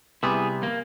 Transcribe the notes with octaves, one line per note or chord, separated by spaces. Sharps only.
C3 G3 B3 E4 G#4
A#3